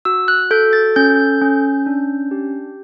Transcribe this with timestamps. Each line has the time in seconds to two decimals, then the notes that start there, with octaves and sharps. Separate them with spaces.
0.05 F#4 E6
0.28 F#6
0.51 A4 G6
0.73 A6
0.96 C#4 G6
1.41 C#4
1.86 D4
2.31 G4